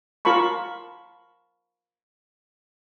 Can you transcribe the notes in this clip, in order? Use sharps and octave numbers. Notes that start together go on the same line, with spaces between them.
F4 A#4 A5 B5 C#6